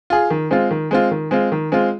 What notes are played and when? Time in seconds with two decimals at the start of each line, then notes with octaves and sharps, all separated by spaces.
0.10 F4 G#4
0.30 D#3
0.51 G#3 C4 F4
0.71 D#3
0.91 G#3 C4 F4
1.11 D#3
1.31 G#3 C4 F4
1.52 D#3
1.72 G#3 C4 F4